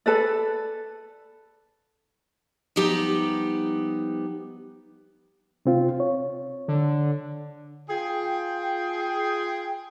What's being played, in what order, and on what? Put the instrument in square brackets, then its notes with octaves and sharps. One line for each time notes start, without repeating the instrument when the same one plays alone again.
[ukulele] A4 B4 D5
[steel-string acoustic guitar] F3 G3 B3 D#4 G4
[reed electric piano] C3 C4 F4
C#5
[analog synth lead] D3
[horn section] F4 G#4 G5